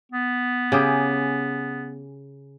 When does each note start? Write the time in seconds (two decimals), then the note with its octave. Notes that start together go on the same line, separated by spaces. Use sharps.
0.12 B3
0.72 C#3 G4 G#4